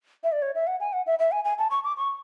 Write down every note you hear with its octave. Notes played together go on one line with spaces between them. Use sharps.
E5
D5
C#5
E5
F#5
G#5
F#5
E5
E5
G#5
G#5
A5
C#6
D6
C#6